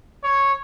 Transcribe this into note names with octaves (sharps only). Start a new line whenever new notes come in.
C#5